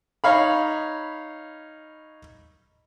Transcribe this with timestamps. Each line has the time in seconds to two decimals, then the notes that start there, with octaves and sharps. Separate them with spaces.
0.24 D#4 C#5 F5 B5